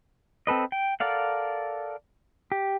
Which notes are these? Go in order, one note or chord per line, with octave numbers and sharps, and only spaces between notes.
C4 A4 B4 D#5
G5
A4 A#4 D5 F5 F#5
G4